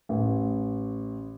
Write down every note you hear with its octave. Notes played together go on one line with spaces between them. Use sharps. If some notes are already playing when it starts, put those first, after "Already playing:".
A1